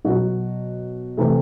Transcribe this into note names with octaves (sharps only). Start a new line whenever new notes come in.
B2 F#3 B3 F#4
C3 E3 A3